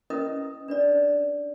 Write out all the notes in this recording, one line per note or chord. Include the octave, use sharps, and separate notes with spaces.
C#4 E4 A#4 B4 D#5 D#6
D4 B4 D5